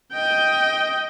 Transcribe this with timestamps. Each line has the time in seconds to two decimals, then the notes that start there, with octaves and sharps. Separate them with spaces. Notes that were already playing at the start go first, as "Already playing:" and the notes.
0.13 D#5 G5